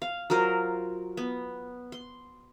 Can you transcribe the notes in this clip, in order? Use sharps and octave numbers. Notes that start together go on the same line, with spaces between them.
F5
F#3 F4 A#4 C5
B3
C6